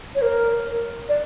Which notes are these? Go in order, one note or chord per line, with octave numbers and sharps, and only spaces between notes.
C#5
A#4
D5